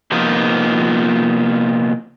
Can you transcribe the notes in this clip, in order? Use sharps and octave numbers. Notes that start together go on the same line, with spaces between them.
C3 F3 A#3 B3 D#4 F4